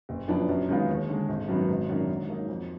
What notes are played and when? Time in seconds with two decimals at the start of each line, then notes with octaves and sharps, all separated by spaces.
0.09 F#1
0.28 F#2 F3 B3 D4
0.49 F#2
0.69 D#3 G#3 B3 F4
0.89 D#2
1.09 D3 G#3
1.29 G#1
1.48 F#2 D#3 F#3 B3
1.69 G#1
1.89 F#2 D#3 A#3 D4
2.09 G#2
2.29 F#3 A#3 D#4
2.49 F2